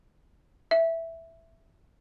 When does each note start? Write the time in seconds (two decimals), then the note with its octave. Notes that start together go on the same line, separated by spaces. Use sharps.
0.71 E5